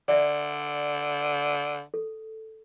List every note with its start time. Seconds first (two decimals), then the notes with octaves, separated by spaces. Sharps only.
0.08 D3 D5 E5
1.94 A4